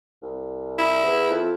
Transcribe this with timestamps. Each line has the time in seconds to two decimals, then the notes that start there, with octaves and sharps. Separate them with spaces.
0.22 C2
0.79 E4
1.03 E2
1.30 F2